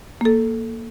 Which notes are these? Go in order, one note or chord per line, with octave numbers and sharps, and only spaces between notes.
A#3 A4